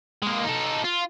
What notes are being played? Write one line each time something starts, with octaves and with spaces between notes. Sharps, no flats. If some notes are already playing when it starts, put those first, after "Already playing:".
G#3 A#3
D#4 A4
F4